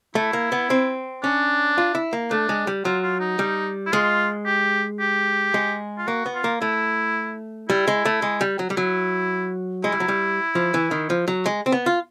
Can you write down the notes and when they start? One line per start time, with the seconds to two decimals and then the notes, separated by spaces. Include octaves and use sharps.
0.15 A3 E4
0.33 A#3
0.52 B3
0.70 C4
1.23 C#4 D4
1.78 F4
1.95 E4
2.13 A#3
2.31 A3 D4
2.49 G#3
2.67 G3
2.85 F#3 F4
3.03 F4
3.20 D#4
3.39 G3
3.87 E4
3.92 G#3 F4
4.46 G4
5.00 G4
5.54 G#3
5.98 F4
6.08 A#3 F#4
6.26 B3
6.35 F4
6.44 A#3
6.61 A3 E4
7.69 G3 E4
7.88 G#3
8.05 A3
8.22 G#3
8.41 G3
8.59 F#3
8.70 G3
8.76 F#3 E4
9.84 G#3 E4
9.92 G3
10.00 F#3
10.08 G3
10.55 F3
10.74 E3
10.91 D#3
11.10 F3
11.28 F#3
11.46 G#3
11.66 C4
11.72 B3
11.86 F4